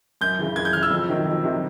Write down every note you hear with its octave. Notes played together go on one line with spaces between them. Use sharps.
F#2 G6
C#3 E3
F#2 G#6
G6
C#3 E3 F6
E6
F2
C3 D#3 F#3
F2
C3 D#3 F#3